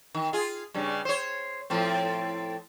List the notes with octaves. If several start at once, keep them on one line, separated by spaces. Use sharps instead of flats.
D#3
F4 G#4
G2 C#3 G3
C5 C#5
A2 F3 C4